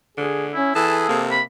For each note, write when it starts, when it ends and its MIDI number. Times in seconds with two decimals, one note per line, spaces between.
0.18 0.55 50
0.18 0.47 68
0.54 0.73 61
0.54 0.74 64
0.75 1.05 52
0.75 1.23 68
0.75 1.34 69
0.75 0.97 81
1.09 1.40 48
1.09 1.42 58
1.31 1.42 83